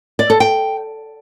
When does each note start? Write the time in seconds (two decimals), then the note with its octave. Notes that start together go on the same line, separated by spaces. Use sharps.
0.19 D5
0.30 A4
0.40 G5